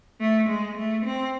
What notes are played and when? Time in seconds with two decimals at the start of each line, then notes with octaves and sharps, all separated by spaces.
0.21 A3
0.49 G#3
0.77 A3
1.06 C4